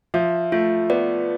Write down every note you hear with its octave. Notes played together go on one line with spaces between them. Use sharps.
F3 E5
A3 F4
B3 D5